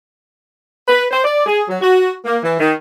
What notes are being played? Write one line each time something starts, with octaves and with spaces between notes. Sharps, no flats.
B4
C5
D5
G#4
F#3
F#4
A#3
E3
D#3